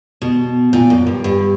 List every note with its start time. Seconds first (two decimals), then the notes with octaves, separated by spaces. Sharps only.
0.22 B2
0.73 A#2
0.90 F#2
1.07 G2
1.24 G2